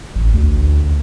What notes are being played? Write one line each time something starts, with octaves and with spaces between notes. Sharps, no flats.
A1
D2